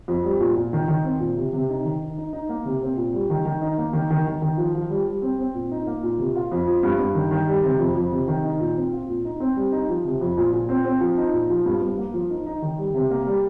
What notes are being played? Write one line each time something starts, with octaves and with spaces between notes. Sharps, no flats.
F2
G3
A#2
A#2
D#3
D#3
C4
A#2
C3
C3
D#4
D#3
D#4
D#4
D#4
A#3
C3
C4
A#2
G3
D#3
D#3
D#4
A#3
D#3
D#3
D#3
D#3
F3
F3
G3
G3
C4
C4
A#2
D#4
A#3
A#2
C3
F4
F2
F3
G2
G2
D#3
D#3
G3
C3
F2
F2
C3
D#3
D#4
A#2
C4
F4
A#2
D#4
C4
G3
D#4
F3
C3
F2
A#2
A#2
C4
C4
F3
D#4
A#2
F3
G2
G2
A#3
F3
D#4
D#4
D#3
G3
C3
A#3
G3